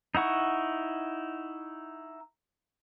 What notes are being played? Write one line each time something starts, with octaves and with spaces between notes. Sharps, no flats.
D#4 E4 F#5 C#6